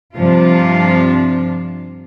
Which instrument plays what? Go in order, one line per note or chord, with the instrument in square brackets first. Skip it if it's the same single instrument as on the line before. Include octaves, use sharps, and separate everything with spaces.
[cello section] G2 C3 F3 D4 F4